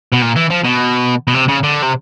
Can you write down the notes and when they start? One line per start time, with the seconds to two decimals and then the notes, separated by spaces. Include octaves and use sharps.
0.12 B2
0.22 A#2
0.36 E3
0.50 F3
0.64 B2
1.28 B2
1.34 C3
1.48 C#3
1.63 D3
1.82 C3